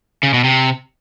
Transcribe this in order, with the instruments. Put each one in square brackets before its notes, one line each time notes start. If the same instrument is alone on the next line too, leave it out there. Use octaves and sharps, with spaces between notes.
[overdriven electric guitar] C#3
B2
C3